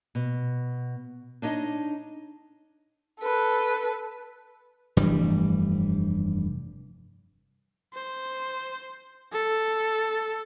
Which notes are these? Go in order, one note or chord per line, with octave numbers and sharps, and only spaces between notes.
B2
D4 D#4 C#5 D#5
A4 B4
F1 G2 E3 G3
C5
A4